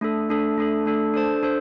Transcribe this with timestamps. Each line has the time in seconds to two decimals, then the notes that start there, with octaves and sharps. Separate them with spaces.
0.01 A3 D4 A4
0.30 A3 D4 A4
0.57 A3 D4 A4
0.86 A3 D4 A4
1.14 D4 A4 C5 A5
1.43 D4 A4 C5